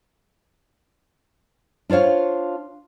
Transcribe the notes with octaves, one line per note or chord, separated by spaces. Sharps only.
D4 F4 C5 C#5 F5